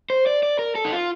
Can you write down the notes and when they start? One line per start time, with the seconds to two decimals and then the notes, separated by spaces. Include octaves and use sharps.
0.10 C5
0.27 D5
0.43 D5
0.59 A#4
0.75 A4
0.85 D#4
0.92 F4